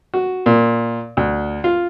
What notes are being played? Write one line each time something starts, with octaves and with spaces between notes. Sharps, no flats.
F#4
A#2
D2
F4